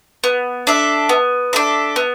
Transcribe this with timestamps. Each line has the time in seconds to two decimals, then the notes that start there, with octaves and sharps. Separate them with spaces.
0.24 B3
0.67 D4 A4 E5
1.09 B3
1.53 D4 A4 E5
1.96 B3